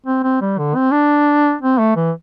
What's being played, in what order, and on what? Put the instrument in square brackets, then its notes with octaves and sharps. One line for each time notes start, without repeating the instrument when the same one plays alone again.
[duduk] C4
C4
G3
D3
C4
D4
C4
A3
E3